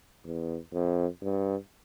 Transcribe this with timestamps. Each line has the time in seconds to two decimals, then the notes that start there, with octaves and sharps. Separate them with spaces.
0.25 E2
0.73 F2
1.22 G2